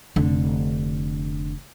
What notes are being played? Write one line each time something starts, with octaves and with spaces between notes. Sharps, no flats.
F1 D3